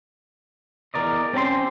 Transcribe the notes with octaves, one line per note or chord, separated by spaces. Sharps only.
E2 A#4 D5 D#5
C4 C#4 G4 A#5 C6